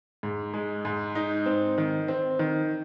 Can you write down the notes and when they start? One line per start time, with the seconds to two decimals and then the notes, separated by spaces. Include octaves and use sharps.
0.23 G#2
0.54 G#3
0.85 G#2
1.15 D#4
1.46 C4
1.78 D#3
2.08 C4
2.39 D#3